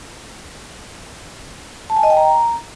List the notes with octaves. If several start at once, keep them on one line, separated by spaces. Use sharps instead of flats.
A5
G#5
D#5
G5
A#5